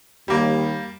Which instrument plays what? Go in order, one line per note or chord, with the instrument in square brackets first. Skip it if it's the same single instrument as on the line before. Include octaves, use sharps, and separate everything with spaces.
[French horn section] D#2 [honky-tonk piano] G3 A#3